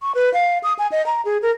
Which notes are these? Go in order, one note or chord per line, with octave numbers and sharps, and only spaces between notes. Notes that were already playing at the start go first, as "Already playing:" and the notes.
C#6
B4
F5
D#6
G#5
D#5
A#5
G#4
A#4